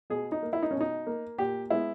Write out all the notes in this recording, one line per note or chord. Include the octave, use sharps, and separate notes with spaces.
B2 G#4
D#4
A#3
E4
D#4
C#4
B2
D#4
A#3
A#2 G4
G#3 B3 E4